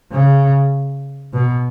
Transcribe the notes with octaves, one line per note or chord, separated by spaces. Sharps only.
C#3
B2